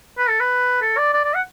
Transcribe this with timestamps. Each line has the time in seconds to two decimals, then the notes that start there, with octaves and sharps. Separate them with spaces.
0.18 B4
0.29 A4
0.40 B4
0.82 A4
0.98 D5
1.13 D5
1.25 D5
1.34 F#5